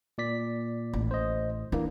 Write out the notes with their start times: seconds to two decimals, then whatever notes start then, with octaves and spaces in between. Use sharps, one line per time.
0.18 A#2 D5 B6
0.93 A1
1.11 C5 D#5
1.72 E3 A#3 D4